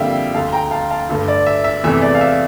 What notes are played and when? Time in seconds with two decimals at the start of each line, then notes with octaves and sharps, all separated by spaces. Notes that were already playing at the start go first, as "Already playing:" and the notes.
Already playing: F2 D3 G3 A#3 E5 F5 G5
0.34 D2 D3 A3 F5 A5
0.53 G5 A#5
0.71 F5 A5
0.91 F5 A5
1.09 G2 D3 A3
1.28 D5
1.46 E5
1.64 E5
1.83 E2 C3 E3 A3 E5
2.02 D5
2.15 F5
2.21 E5